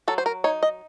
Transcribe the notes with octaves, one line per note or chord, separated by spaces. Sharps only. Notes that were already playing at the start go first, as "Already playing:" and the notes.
F#3 A4
C5
A#4
D#4 C#5
D#5